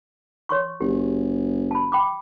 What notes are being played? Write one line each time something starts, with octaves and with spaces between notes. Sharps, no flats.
C#5 C6 C#6
F#1 G4
A5 B5
G5 B5 D6